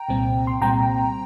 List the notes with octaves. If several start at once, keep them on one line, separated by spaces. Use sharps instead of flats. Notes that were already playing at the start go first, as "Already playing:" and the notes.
Already playing: G5 A#5
C2 A#2 G3 C4
C6
C2 A#2 G3 C4 G5 A#5